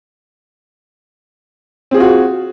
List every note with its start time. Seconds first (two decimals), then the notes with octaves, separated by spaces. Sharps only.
1.91 C4
1.94 G#4
1.97 F4
2.00 F#4